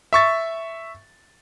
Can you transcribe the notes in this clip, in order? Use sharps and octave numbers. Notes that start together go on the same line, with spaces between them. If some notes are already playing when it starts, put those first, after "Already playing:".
E5 C#6 A6